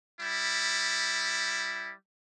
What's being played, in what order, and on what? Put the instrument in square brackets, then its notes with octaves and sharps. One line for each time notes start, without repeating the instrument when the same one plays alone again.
[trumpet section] G3 E4